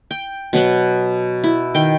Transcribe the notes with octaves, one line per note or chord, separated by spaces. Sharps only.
G5
B2 F#3 B3 F#5
E4
D#3 G5